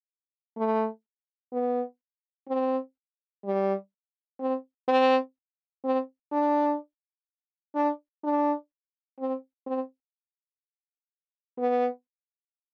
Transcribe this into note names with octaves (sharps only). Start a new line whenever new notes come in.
A3
B3
C4
G3
C4
C4
C4
D4
D4
D4
C4
C4
B3